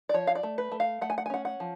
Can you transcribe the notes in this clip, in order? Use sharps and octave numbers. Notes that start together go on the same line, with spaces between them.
D5
F3 C#5
F5
D5
A3
B4
A3
F5
A3 F#5
G#5
F#5
G#5
C#4 F#5
F#5
F3